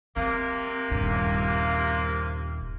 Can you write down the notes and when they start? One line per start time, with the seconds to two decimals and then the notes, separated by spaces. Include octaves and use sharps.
0.16 C3 A#3 C4
0.91 D#1 G2